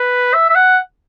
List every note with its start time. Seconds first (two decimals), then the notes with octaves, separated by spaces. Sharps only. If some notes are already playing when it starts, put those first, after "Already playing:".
Already playing: B4
0.34 E5
0.50 E5
0.55 F#5